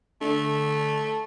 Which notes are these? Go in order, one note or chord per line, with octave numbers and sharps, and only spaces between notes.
D3 A3